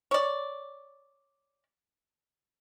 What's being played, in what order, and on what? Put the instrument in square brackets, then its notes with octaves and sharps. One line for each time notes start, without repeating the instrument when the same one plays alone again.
[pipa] C#5 D5